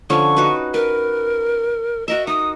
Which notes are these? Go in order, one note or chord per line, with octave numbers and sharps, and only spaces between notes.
D3 F3 C#4 C#6
D#4 F#4 B4
A#4 B4
F#4 A#4 D#5 E5
D#4 D#6